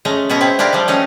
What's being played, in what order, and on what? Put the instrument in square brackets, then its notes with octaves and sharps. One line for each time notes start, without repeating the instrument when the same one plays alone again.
[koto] G#3 A3 C#4 A#5
B2 B3 C#4 E5 A#5
C4 E4
D4 E4 F4 G4 A#4
F3 G3
A3 C#4 D#4